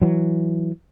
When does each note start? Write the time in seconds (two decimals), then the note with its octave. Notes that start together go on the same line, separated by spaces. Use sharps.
0.02 E3 F#3